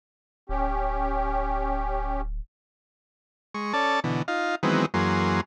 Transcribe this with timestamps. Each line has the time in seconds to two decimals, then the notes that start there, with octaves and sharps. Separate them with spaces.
0.49 D1 C#4 G4
3.54 G#3 C#6
3.73 C#4 A4 D5 A5
4.04 B2 D3 E3
4.28 D#4 F4 F5
4.63 D#3 E3 F#3 G#3 B3 C4
4.94 F#2 E3 F#3 A#3 G#4 C6